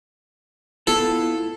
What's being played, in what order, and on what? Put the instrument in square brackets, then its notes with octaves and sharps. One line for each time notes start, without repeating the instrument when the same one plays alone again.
[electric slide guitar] B3 E4 F4 [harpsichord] A4